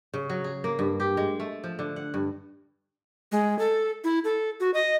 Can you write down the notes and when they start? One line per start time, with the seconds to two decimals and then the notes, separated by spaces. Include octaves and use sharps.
0.14 C#3
0.30 F#3
0.44 G#4
0.64 A#3
0.79 G2
1.00 G4
1.17 G#3
1.40 A3
1.64 F3
1.79 D3
1.96 F#5
2.14 G2
3.32 G#3
3.59 A4
4.04 E4
4.25 A4
4.60 F#4
4.74 D#5